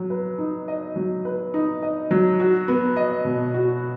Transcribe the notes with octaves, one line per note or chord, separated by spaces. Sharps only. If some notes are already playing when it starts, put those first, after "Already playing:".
Already playing: F#3
B4
D#4
D#5
F#3
B4
D#4
D#5
F#3
F#4
B3
D#5
B2
F#4